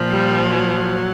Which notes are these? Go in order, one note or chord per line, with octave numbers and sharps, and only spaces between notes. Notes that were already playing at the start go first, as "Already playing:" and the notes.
Already playing: A#2 F3
G3
F#3